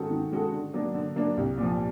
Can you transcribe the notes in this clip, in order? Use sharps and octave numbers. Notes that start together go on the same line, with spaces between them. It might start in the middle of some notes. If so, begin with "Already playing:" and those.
Already playing: D#3 G#3 C#4 F#4 A4
D#3
G#3 C#4 F#4 A4
D3
F#3 A#3 D4
D3
F#3 A#3 D4
C2
A#2 F3